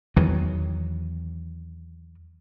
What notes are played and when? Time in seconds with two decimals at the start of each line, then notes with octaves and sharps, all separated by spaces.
0.16 E2 D#3 E3 F#3